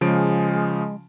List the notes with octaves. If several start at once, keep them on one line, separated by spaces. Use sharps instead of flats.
C#3 F3 G#3 D7